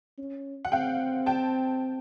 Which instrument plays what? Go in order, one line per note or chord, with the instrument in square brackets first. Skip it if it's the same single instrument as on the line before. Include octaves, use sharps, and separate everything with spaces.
[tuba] C#4
[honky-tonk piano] F#5
[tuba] C4 [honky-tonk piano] F5 G5
[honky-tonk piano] G5 A5